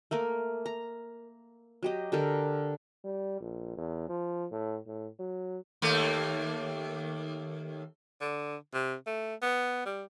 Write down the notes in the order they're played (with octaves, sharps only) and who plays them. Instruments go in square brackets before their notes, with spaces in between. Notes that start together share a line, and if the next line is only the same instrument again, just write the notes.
[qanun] A3 A#3 A#4
A#5
F#3 G4 D#5
D3 G4 A4 A#4
[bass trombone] G3
A#1
E2
F3
A2
A2
F#3
[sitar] D#2 A3 A#3
[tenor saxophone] D3
C3
A3
B3
G3